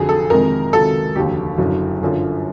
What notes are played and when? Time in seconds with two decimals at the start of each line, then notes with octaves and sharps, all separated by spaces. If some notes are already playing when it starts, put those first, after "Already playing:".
Already playing: F1 F2 D3 F#3 G#4
0.09 A4
0.30 F2 C3 D#3 G#3 A#4
0.73 C#2 C3 D#3 F#3 A4
1.16 F1 D#2 D3 F#3 G4
1.58 F#1 F#2 D3 F#3
2.01 G1 F#2 D3 F3